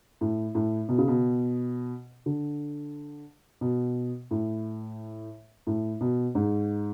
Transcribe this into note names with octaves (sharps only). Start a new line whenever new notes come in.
A2
A2
B2
C#3
B2
D3
B2
A2
A2
B2
G#2